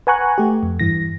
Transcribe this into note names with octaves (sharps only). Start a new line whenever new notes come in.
B4 F#5 G#5 A#5 C#6 F#6
A3 G4
F2
G2 E3 A#6